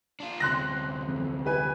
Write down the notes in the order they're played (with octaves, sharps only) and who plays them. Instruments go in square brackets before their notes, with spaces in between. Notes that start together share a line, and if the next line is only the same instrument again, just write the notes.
[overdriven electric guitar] D4 F4
[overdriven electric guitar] D2 C3 [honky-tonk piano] C6 F#6 A#6
[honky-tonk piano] F2
G4 B4 G#5